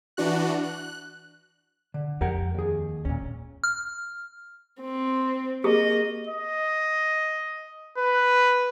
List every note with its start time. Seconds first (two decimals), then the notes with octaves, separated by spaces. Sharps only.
0.17 E3 D4 F#4 F#6
0.63 F#6
1.94 D3
2.21 F2 G4 A#4 F#5
2.55 D#2 G#4
3.05 D#2 A#2 C#4
3.64 F6
4.82 C4
5.64 A#3 G4 G#4 D#5 D#6
6.27 D#5
7.98 B4